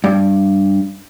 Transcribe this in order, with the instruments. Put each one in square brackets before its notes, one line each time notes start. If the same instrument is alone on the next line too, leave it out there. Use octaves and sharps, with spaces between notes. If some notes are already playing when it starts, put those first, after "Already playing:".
[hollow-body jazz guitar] G2